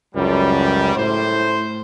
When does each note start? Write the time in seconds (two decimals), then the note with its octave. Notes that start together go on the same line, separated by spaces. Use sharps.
0.15 C#2 F#2 G3
0.95 A2 C5